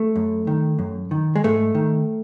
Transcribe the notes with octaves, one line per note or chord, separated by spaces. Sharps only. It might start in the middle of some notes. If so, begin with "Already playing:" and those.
Already playing: A3
F#2
D#3
F#2
D#3
G#3
G#2 A3
D#3